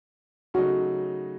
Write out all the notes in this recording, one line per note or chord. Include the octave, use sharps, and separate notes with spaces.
C#3 F#3 A3 D#4 F#4